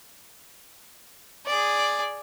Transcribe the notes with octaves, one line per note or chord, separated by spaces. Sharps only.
G#4 D5